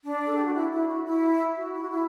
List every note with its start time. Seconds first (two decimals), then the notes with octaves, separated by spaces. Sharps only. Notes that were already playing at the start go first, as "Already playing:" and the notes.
0.05 D4
0.24 A4
0.35 G4
0.45 F#4
0.55 E4
0.72 E4
0.88 F#4
1.05 E4
1.56 F#4
1.73 E4
1.82 F#4
1.89 E4